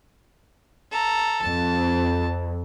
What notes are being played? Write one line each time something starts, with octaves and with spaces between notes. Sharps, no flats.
A4 A#5
F2 A5